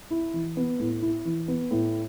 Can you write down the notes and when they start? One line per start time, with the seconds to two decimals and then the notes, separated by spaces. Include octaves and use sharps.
0.11 E4
0.34 E3
0.57 B3
0.79 A2
1.02 E4
1.25 E3
1.48 B3
1.71 A2